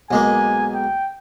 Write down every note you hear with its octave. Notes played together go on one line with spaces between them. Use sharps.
B1 G#3 A#3 G#5
G5